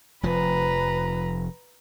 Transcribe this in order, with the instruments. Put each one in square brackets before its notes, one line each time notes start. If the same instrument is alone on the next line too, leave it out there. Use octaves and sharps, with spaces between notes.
[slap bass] F1 F3 [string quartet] B4 A#5